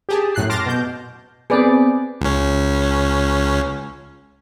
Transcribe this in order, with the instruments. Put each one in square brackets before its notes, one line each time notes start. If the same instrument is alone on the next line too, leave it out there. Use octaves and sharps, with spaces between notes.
[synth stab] G4 G#4 A5
F#2 A2 F#6 C7
A5 C6 D6 F6 A6 A#6
B2 G6
[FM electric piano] B3 C4 [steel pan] G#4 B4 D5
[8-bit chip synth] C#2 C#4